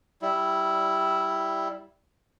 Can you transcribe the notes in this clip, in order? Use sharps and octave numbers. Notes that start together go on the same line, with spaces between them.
G3 E4